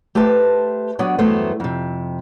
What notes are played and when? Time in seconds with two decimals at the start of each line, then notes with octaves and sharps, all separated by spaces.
0.15 A3 G4 B4 C5 A5
0.99 F#3 B3 D4 C#5 D5
1.18 E2 G2 F#3 A3 B3 C5
1.60 F2 C3